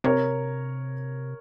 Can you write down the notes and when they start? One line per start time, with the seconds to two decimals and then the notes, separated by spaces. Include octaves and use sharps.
0.04 C3 A#4 C#5